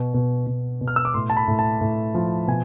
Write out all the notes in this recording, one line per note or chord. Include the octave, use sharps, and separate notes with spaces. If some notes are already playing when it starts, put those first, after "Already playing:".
Already playing: B2
B2
B2
B2
F6
E6
D6
A2 C6
A5
B5
A2
A5
A2
F3
B2 G#5